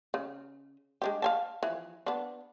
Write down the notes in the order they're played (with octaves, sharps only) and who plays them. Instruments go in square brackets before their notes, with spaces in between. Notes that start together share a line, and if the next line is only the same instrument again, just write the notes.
[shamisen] C#3
G#3 D4 G4
F5 G#5 A5
E3 F3
B3 D4